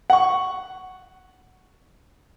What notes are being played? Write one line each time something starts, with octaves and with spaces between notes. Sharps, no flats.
F#5 C#6